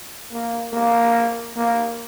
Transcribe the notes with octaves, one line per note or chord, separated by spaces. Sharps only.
A#3
A#3
A#3